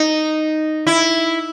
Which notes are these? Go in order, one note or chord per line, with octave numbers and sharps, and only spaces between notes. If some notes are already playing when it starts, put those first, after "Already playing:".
Already playing: D#4
E4